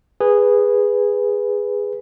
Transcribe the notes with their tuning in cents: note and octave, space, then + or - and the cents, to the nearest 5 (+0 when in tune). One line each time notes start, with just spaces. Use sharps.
G#4 -15 B4 +0